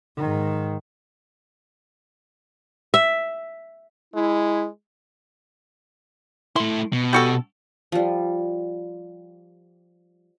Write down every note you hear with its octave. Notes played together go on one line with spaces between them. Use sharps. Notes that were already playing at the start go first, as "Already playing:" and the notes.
G#2 D#3
E5
G#3 E4
A3 E4 C6
B2
G3 F#4 A4
F3 G3